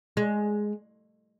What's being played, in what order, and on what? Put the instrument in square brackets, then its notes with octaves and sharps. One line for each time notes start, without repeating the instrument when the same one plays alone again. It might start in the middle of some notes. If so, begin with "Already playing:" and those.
[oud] G#3